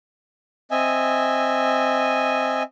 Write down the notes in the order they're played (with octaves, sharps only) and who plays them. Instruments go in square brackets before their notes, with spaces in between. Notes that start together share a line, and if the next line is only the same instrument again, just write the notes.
[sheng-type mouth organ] C4 D#5 E5 G#5